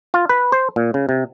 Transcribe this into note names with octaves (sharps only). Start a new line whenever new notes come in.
F4
B4
C5
A#2
C#3
C3